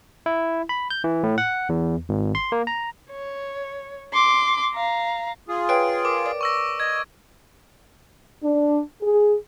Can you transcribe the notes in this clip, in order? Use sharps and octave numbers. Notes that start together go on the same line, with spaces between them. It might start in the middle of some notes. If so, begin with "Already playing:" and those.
E4
B5
G6
E3
A2
F#5
E2
G#1
C6
A#3
A#5
C#5
C6 D6
F5 A#5
F4 G#4
B4 C#5 G5 D7
A#4 D6
D5
C#6 E6 A#6
D#5 G#6
D4
G#4